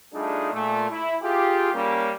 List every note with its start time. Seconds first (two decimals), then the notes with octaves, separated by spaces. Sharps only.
0.14 G3 A3 D4 D#4 F4 G#4
0.53 A#2 A3
0.90 E4
1.22 F4 G4 G#4
1.74 G3 A#3 C#4